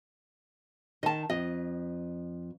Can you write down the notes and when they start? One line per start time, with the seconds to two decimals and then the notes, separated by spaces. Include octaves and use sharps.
1.03 D#3 D#5 A5
1.30 F2 D#5